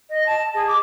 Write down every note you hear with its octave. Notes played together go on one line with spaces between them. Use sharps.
D#5
A5
G#4
D6